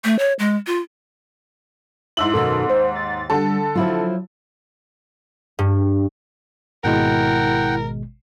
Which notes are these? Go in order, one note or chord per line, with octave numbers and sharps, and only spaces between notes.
A3
C#5
G#3
F4
G#2 E4 E6 F#7
F#2 B2 D#3 A4
D#2 C5
A6
D3 G3 A4
F3 F#3 E4 F4
G2
G#1 B2 G#3 E4 A#4 F#5 G5